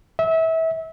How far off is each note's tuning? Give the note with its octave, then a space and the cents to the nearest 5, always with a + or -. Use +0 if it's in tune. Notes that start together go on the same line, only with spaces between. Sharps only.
E5 -25